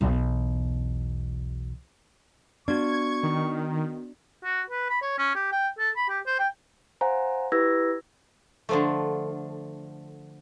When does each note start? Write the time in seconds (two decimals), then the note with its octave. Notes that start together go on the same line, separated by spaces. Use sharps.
0.01 B1 E2
2.68 B3 D4 F#4 C#6 G#6
3.23 D#3
4.44 F#4
4.70 B4
4.90 B5
5.02 C#5
5.18 C#4
5.35 G4
5.52 G5
5.79 A4
5.97 B5
6.09 G4
6.26 C5
6.39 G5
7.01 C5 F5 F#5 G#5 A#5
7.52 E4 G4 B4 E6 G#6 A#6
8.69 D3 F3 A3